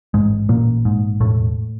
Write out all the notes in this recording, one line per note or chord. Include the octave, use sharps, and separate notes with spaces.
A1 G#2 G#3
A1 A#2 A#3
G#2
E1 A2 A3